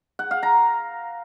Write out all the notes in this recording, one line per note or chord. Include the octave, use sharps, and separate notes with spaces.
F#5
F5
A#5